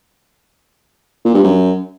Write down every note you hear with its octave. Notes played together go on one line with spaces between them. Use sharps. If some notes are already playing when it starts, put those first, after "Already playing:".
A#2
G2
F#2